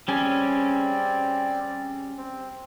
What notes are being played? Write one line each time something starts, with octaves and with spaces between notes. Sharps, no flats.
G3 C4 C#4 G#4 D5
C4